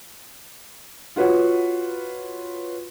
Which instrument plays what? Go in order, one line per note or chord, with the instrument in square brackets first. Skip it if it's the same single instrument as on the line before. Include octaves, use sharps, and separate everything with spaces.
[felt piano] F4 F#4 B4 C#5 F#5